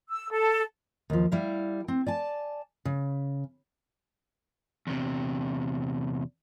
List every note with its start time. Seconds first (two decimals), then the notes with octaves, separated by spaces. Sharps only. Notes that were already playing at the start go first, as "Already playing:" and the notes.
0.10 E6
0.32 A4
1.10 D#2 F3
1.32 G3 E4 F5
1.88 C4
2.07 D5 G#5 A5
2.85 C#3
4.87 E2 C3